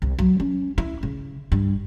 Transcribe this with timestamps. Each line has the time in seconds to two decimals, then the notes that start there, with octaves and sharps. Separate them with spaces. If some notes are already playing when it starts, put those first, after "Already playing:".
0.02 C2
0.19 F#3
0.40 C#4
0.78 E4
1.03 C#3
1.52 G2